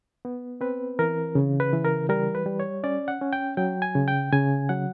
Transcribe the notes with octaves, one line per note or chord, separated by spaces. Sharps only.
B3
C4 B4
E3 A#4
C#3
B4
E3
A#4
G3 A#4
B4
G3
C#5
C#4 D5
F#5
C#4
G5
F#3 G5
G#5
C#3
G5
C#3 G#5
F#3 F#5